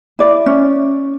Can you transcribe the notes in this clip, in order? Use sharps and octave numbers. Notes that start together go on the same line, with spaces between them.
E4 D5
C#4